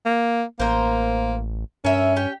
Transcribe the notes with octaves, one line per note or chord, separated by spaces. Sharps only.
A#3
A1 A#3 A#4 C5
G2 C#4 A#4 E5
G4 G5